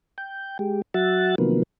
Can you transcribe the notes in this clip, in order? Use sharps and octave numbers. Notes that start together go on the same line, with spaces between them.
G5
G#3 G4
F#3 F#4 E5 F#5 A6
C3 D#3 F3 F#3 A#3 B3